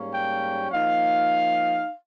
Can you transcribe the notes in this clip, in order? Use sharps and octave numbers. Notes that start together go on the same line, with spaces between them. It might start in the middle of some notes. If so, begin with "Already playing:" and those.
Already playing: G#2 G3 A#3 C#4
G5
F3 A#3 D#4 F5